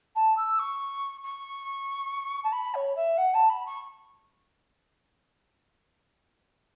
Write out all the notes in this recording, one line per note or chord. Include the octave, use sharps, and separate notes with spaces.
A5
E6
C#6
C#6
A5
B5
C#5
E5
F#5
A5
B5
C#6